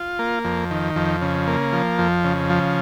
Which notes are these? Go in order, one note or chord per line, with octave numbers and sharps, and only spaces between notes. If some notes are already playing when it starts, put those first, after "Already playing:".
Already playing: F4
A#3
F2
D#3
F2
C#3
A#3
F3
F2
C#3
F3